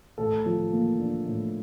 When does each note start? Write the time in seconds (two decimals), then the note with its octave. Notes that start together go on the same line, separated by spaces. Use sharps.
0.18 A2 A4
0.46 F3
0.72 A#3
0.99 D4
1.26 A2